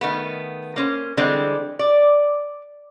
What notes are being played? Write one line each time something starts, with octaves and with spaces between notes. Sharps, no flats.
D#3 A3 B3
A#3 C#4 C5
D3 E3 G3 G#3 C4
D5